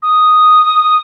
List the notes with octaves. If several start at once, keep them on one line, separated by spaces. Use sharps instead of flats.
D#6